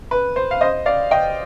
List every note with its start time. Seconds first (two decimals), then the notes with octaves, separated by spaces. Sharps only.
0.11 B4
0.36 C5
0.51 F5
0.61 C5 D#5
0.86 D5 F5
1.11 D#5 G5